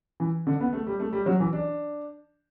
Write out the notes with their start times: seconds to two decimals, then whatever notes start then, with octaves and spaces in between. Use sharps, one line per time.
0.20 E3
0.47 D3
0.60 B3
0.73 A3
0.87 G3
1.00 A3
1.13 G3
1.26 F#3
1.40 E3
1.53 D4